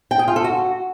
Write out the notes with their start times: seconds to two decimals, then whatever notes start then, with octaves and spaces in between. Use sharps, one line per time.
0.11 G5
0.19 G#4
0.28 F4
0.36 A4
0.44 F#4